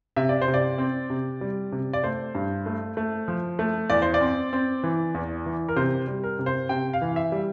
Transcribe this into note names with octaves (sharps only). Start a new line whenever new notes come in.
C3 E5
D5
C5
C3
D5
C4
C3
G3
C3
D5
A3 C5
G2
A3
A3
F3
A3
E2 D5
C5
D5
C4
C4
E3
E2
E3
A#4
C3 C5
G3
A#4
C3
C5
C3 G5
F5
E3
E5
G3